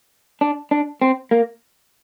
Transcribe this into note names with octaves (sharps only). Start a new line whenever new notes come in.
D4
D4
C4
A#3